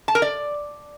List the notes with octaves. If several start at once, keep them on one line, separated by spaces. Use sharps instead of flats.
A5
A#4
D5